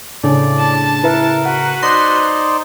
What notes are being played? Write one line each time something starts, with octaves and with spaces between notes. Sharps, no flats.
A2 C#3 D4 D5
A5
E4 A#4 B4 E5
F#4 B4 F#5
D#4 C5 D5 C6 A#6